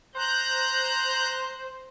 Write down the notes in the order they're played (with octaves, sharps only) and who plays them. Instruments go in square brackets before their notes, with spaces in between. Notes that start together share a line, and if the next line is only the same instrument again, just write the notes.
[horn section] C5 [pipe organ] A#5 F#6 G6